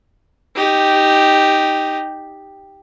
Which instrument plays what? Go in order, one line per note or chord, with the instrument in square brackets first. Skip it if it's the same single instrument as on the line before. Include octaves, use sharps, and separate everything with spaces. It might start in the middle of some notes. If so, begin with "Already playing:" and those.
[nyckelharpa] D#4 G4